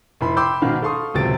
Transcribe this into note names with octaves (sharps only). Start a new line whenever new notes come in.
F1 E4 B5 C6
G5 B5 C6 D6 E6 G6
G#1 B2 D#3 F5 F6
A4 F5 C6 C#6 D#6
D#1 C#2 C3 F#3 A6 D7